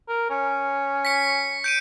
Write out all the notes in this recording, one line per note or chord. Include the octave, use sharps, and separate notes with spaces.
A#4
C#4
B6 C#7
G6 D7 D#7